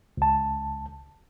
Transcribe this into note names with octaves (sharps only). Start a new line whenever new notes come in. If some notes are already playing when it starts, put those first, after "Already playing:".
C#2 A5